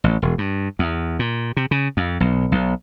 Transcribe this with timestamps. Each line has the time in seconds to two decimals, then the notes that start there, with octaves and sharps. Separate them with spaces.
0.04 A1
0.22 E1
0.38 G2
0.79 E2
1.19 A#2
1.57 C3
1.71 C#3
1.97 F2
2.20 B1
2.52 B1